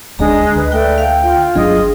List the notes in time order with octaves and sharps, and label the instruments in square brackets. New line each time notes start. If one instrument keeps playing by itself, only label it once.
[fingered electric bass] D#1 D2 D4 [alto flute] G#3 [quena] D#5 [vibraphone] A#5
[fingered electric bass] D2 [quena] B4
[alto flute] A3 [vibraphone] D5 G5
[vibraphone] F5 [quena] G5
[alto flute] F4
[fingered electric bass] G1 F#3 D4 [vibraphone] G#4 [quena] D#5